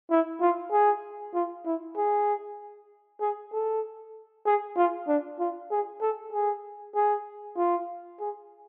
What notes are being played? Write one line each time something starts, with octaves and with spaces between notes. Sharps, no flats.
E4
F4
G#4
F4
E4
G#4
G#4
A4
G#4
F4
D4
F4
G#4
A4
G#4
G#4
F4
G#4